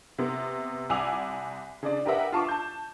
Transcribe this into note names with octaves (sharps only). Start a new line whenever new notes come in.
C3 B3
C2 F#5 G#5 D6 E6 F7
C#3 D4 D5
G4 A#4 B4 E5 F#5
F4 A5 C#6 D6
A5 G6